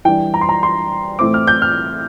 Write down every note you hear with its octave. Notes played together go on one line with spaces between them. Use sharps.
E3 G3 D4 G5
A#5
C6
A#5
C6
A2 E3 A3 C4 D6
F6
G6
F6